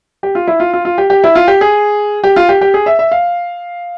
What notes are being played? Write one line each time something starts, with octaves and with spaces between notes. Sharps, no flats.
G4
F4
E4
F4
F4
F4
G4
G4
E4
F4
G4
G#4
G4
F4
G4
G4
G#4
E5
E5
F5